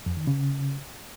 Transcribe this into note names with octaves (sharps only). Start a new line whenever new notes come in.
F2
D#3
C#3